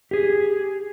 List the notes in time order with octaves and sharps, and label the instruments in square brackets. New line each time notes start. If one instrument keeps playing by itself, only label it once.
[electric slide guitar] G4 G#4